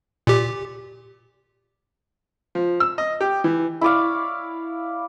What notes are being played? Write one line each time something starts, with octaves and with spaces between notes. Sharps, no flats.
A#2 G4
F3
E6
D#5
G4
E3
E4 C#5 D5 F5